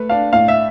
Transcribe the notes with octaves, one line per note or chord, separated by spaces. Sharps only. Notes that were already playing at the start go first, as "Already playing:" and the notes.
Already playing: A3 B4
D4 F5
A2 F5
E5